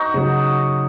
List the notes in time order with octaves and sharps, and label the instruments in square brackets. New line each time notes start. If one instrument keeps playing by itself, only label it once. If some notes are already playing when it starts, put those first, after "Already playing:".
Already playing: [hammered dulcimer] D#4 F#4
[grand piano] C#3 F#3